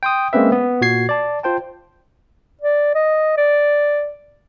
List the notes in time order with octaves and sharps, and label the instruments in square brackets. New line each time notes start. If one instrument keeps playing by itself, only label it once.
[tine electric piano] G5 C6 D#6
G#3 A#3 C4 C#4 B4 E5
B3
A#2 F#4 F#5 G#6 C7
D5 A5
F4 C5 G5 A5
[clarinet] D5
D#5
D5